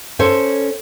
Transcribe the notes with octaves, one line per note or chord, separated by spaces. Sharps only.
C#4 A4 C5 C#5